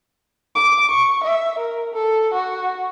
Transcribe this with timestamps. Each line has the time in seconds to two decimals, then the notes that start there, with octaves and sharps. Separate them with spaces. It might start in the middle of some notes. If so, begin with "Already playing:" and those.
0.55 D6
0.91 C#6
1.24 E5
1.58 A#4
1.93 A4
2.34 F#4